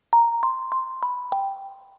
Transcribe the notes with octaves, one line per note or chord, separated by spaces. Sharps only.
A#5
C6
C6
B5
G5